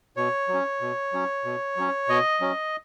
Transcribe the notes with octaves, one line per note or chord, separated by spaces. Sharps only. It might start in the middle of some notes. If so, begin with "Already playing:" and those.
B2 C#5
F#3
C#4
B2
F#3 C#4
B2
F#3 C#4
B2 D#5
F#3 C#4